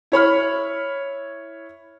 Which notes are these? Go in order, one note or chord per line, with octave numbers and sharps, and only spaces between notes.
E4 C#5 B5 F6